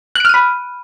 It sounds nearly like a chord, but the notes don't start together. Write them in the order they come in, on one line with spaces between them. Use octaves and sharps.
F#6 D7 F6 D#7 B5